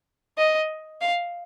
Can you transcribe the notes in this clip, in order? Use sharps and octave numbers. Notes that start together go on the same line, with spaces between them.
D#5
F5